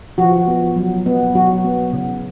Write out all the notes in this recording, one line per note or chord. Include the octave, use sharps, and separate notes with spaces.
F3 F#4
B3
F#3
B3
F#3 F#4
B3
C#3